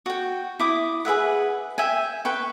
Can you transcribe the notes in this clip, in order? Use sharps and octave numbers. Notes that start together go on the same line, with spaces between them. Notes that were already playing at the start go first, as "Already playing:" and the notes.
F#4 G5
E4 D6 D#6
G#4 B4 E5 F#5
E5 G5 G#5
B4 G5 C#6